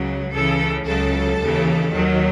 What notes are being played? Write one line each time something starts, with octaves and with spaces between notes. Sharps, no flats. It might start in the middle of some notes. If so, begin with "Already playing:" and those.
Already playing: C#2 C#3 F#3
C#2 C#3 E3 A4
C#2 C#3 F#3 A4
D#2 C#3 E3
D#2 D#3 F#3